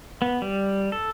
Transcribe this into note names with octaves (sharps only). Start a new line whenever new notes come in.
B3
G3
A4